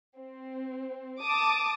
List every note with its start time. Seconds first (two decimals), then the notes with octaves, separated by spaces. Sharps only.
0.16 C4
1.21 A5 D6 D#6